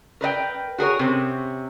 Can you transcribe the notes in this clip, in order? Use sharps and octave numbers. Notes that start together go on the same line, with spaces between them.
A#4 B4 D#5 G5
F#4 G#4 A#4 C#5
C3 C4 C#4